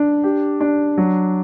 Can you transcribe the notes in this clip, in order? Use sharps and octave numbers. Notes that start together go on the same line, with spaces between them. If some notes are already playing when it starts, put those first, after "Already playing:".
Already playing: D4
G4
D4
F#3